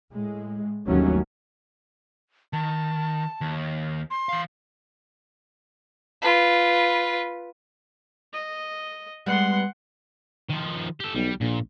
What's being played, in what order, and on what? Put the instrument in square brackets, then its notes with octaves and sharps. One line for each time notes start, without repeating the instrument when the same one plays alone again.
[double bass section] A2 G#3
G1 D#2 D#3 F#3 A3 C#4
[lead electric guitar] D#3 [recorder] A5
[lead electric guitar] D#2
[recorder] C6
[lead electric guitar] E3 F5
[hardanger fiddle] F4 B4
[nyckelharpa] D#5
[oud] G3 G#3 B3 [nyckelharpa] F#5 C6
[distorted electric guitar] D#3 F3
G4 A4
[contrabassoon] B1 [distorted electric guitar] G3
[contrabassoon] A#1 [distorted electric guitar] A#2